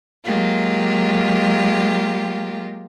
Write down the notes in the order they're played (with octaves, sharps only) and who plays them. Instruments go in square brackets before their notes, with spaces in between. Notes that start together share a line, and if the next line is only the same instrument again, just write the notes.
[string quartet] F#3 G#3 A#3 F4 G4